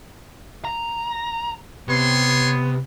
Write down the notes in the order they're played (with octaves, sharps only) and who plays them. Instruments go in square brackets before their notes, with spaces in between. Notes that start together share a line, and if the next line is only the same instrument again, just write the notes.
[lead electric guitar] A#5
[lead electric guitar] C3 [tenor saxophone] B3 [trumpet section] C#5 C6